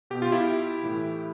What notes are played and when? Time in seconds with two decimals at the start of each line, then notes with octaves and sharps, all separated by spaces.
0.10 B2 G4
0.22 F4
0.32 E4 G4
0.83 A2 E3